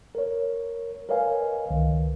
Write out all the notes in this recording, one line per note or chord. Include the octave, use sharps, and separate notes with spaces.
A#4 C#5
A#4 B4 C#5 D#5 F5 G#5
C#2 D#3